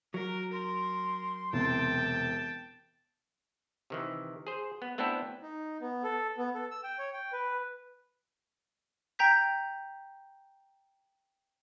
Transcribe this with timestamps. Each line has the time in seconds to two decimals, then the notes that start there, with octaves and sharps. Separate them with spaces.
0.14 F#3 A#4
0.53 A#4 C6
1.53 E1 C3 G5 A5
3.90 C3 D#3 E3
4.47 G#4 C5
4.82 B3
4.98 A3 B3 C4 D4 E4 A4
5.42 D#4
5.81 B3
6.04 A4
6.38 B3
6.55 A4
6.71 E6
6.84 G5
6.99 C#5
7.13 G5
7.32 B4
9.19 G5 A#5 G6 B6